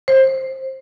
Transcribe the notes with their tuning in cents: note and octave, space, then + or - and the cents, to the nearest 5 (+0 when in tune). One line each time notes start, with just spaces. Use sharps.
C5 +20